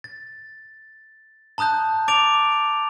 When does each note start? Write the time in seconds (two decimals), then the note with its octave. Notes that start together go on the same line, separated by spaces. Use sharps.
0.04 A6
1.58 A5 A#5 D#6 F#6 G6
2.08 D6 A6 D7 F7